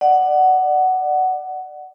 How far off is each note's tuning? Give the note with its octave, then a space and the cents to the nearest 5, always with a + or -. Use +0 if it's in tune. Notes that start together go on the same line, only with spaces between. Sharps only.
D5 +25 F#5 +10